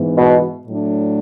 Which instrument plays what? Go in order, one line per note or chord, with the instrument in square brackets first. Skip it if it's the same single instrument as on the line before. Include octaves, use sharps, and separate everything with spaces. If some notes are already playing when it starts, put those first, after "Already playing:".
Already playing: [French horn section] G#2 E3 B3
[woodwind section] B2
[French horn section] A2 F#3 A3 D4